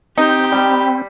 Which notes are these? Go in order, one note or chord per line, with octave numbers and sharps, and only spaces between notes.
C4 D#4 G4 G5
G3